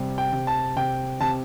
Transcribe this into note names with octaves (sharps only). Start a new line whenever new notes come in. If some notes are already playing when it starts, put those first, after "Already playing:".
Already playing: C3 G3
G5
C3
A5
C3 G5
C3 A5